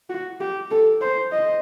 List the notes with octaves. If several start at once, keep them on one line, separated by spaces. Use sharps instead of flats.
F#4
G4
A4
C5
D#5